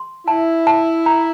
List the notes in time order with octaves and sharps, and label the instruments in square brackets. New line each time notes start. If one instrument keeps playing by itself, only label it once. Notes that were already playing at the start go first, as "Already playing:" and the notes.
Already playing: [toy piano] C6
[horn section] E4 [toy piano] A5
[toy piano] A5
A#5